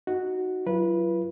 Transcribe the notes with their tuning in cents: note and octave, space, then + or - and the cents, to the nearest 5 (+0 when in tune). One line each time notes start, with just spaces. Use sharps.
D#4 +0 F#4 +0 D#5 +0
F#3 +0 F4 -45 B4 -20